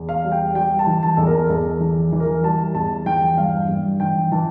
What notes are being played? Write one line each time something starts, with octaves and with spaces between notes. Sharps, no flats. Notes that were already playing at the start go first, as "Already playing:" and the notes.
Already playing: E2
F5
G3
G5
G3 G5
A5
E3
A5
E2 A4
A#4
E2 A4
E3
E3
A#4
G3 A5
E2 A5
E3 G5
G2 F5
G2
E3 G5
E3 A5